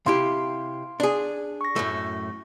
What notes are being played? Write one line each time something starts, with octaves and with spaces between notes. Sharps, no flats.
C3 E4 G4 F5 C6
D4 G#4
C#6 A#6
F#2 A2 A3